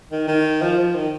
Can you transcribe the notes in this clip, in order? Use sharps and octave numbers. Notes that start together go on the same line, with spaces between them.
D#3
D#3
F3
F3
D#3